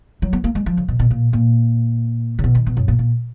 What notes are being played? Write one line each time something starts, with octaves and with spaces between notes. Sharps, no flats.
F#3
B3
A#3
G#3
F3
C#3
B2
B2
A#2
A#2
C#3
B2
D#3
B2
F#2
A#2
A#2